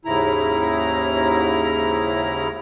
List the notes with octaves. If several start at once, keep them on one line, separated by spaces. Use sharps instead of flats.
D#2 G#2 C#3 E4 A#5